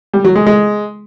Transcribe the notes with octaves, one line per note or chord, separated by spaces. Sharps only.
G3
F#3
G#3
G#3